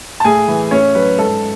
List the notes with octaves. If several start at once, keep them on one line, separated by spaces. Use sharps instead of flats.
A5
A2 G#4 G#5
E3
A2 C#4 C#5
F#3 B4
G#2 A4